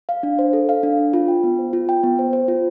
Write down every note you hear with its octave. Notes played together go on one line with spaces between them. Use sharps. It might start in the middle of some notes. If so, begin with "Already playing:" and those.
F5
D4
C5
A4
F5
D4
C5
F4
G5
B3
C5
F4
G5
B3
C5
C5
F4